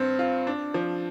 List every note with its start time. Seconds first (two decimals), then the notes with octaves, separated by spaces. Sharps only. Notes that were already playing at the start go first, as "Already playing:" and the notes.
Already playing: G2 C4
0.19 F4
0.47 D4
0.74 F3